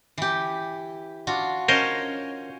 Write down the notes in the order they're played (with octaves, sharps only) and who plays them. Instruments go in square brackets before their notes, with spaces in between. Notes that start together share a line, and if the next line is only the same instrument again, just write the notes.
[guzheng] E3 G4
D4 F4 F#4
[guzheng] C#4 C#5 [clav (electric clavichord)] A#4 C5 D#5